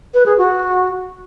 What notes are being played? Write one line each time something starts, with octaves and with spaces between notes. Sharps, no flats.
B4
G#4
F#4